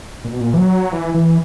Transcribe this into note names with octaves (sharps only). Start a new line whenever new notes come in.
A#2
B2
A#2
E3
F#3
E3
E3